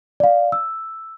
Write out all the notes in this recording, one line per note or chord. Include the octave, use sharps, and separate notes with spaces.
D5 F5
E6